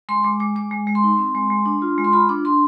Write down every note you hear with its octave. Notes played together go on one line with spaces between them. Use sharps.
G#3 C6
G#3 D6
G#3 D6
G#3 D6
G#3
G#3
C6
D#4
C4
G#3
G#3
D4
F4
G#3
C6
F4 B5
D4 D6
D4 C6